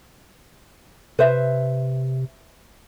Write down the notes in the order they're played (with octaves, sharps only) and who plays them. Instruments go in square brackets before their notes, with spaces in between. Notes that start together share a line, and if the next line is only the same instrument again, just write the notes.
[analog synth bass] C3 [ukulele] B4 C5 E5